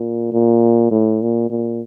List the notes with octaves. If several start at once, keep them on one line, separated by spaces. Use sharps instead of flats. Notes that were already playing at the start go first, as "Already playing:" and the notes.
Already playing: A#2
A#2
A2
A#2
A#2